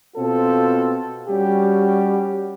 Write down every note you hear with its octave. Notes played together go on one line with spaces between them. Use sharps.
B2 C4 F4 A4
G3 C#4 F#4 G4